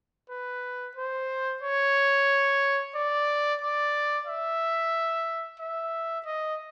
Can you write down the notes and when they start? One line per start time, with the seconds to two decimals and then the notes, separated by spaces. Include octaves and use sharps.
0.30 B4
0.97 C5
1.62 C#5
2.95 D5
3.61 D5
4.27 E5
5.60 E5
6.26 D#5